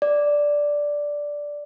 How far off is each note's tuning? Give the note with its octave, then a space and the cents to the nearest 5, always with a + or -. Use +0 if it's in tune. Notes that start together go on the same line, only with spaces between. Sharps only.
D5 -5